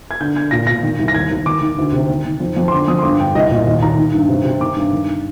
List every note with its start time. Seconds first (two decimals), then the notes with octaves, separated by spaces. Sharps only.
0.11 G#6
0.21 D3 G6
0.36 D3 G#6
0.51 A#2 A#6
0.67 A#2 A#6
0.83 D#3
0.99 C2
1.08 A#6
1.14 D#2 G#6
1.31 D#2
1.46 D#3 D6
1.62 D#3
1.78 D2
1.93 C3
2.10 D#3
2.25 D#3
2.40 F2
2.57 F2
2.68 C6
2.71 D3 D6
2.88 F2 D#6
2.98 C6
3.03 G2 D6
3.20 D3 G5
3.35 C2 D#5
3.50 A#2 D#5
3.67 D#2 D#5
3.82 D#2 A#5
3.98 D#3
4.14 G2
4.29 C3
4.44 C3
4.60 D#3 D6
4.76 G2
4.93 D#3